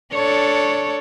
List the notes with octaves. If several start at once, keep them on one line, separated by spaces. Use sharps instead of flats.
D4 A4 C#5